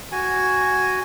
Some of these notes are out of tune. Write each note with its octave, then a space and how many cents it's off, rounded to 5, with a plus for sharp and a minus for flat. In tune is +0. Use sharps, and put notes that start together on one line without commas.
F#4 +10 G#5 +0